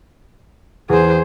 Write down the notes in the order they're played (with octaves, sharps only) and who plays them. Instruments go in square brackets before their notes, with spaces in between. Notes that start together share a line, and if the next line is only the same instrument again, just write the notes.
[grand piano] E2 [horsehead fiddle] G#4 C5